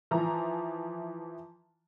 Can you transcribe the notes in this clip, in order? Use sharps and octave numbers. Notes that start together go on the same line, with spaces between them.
E3 F3 A#5